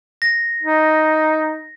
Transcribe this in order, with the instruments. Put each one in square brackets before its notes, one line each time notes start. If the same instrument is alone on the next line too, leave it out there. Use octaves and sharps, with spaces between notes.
[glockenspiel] A#6
[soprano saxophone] D#4